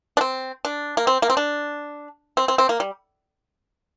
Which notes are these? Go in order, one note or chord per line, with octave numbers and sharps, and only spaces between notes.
D4
C4
D4
A#3
C4
A#3
C4
D4
C4
C4
C4
A#3
G3